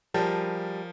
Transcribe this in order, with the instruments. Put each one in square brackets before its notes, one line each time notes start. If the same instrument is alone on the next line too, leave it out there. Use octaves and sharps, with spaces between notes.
[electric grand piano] F3 A#4 A5 [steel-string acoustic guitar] G3 G4 G#4